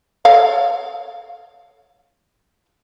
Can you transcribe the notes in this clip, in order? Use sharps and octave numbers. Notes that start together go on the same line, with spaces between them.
A4 C#5 F5